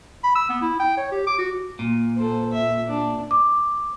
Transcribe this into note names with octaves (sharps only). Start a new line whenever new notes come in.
B5
E6
B3
E4
G5
C#5
G4
D6
F#4
A#2
A4 C5
E5
D4
D6